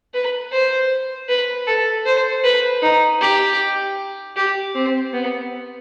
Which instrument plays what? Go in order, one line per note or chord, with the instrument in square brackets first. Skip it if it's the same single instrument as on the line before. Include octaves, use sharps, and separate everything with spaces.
[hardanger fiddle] B4
C5
B4
A4
C5
B4
D#4
G4
G4
C4
B3